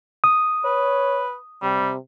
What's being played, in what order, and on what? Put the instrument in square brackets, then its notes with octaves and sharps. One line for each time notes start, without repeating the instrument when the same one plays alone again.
[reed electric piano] D#6
[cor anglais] B4 [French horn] C#5
[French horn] C3 [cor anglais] G3